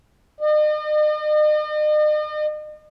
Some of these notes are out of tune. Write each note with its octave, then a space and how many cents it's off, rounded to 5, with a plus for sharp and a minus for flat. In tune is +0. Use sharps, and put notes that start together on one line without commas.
D#5 -45